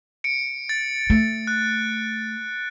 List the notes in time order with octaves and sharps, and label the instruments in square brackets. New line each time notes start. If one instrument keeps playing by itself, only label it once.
[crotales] C#7 D7
A6
[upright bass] A3
[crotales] F#6